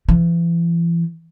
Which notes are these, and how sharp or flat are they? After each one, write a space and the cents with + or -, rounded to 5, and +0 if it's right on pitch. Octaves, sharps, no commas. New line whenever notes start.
E3 +40